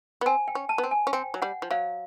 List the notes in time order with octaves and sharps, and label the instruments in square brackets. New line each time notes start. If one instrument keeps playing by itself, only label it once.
[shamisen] B3
[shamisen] C4 [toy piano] G#5
[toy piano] G5
[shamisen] C#4
[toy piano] A5
[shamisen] B3
C4
[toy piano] G#5
[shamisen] C#4
[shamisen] C4 [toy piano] G5
[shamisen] F#3
[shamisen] G3 [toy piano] F#5
[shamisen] F3
[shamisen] F#3 [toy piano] F5